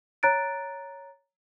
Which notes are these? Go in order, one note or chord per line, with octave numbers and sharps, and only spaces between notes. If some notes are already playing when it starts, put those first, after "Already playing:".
C#5 A#5 F#6 A6 D7